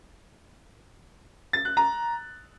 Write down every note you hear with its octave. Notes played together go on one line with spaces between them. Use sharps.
A6
F#6
A#5